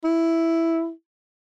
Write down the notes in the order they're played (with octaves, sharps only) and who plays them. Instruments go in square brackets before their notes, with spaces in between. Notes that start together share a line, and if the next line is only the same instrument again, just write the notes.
[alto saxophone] E4